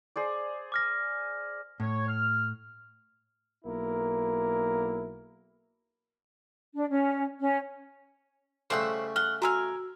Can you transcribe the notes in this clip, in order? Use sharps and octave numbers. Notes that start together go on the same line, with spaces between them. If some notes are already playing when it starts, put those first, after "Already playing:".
G#4 C5 D5
D6 F6 A#6
A2 C#5
F6
B1 A#3 E4 A#4
D4
C#4
C#4
C#3 G3 A3 C5 F#5 E6
F#5 F6 G7
F#4 A#4 G#5 E6 F6